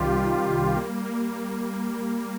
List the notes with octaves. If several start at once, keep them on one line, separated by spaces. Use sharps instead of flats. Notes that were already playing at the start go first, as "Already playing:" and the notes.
Already playing: C2 C3 D#3 G3 F4 G4
C3
G3
A#3
A#3